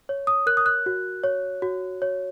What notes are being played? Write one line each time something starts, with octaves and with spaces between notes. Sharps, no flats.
C#5
D#6
A#4 F#6
D#6
F#6
F#4
C#5
F#4
C#5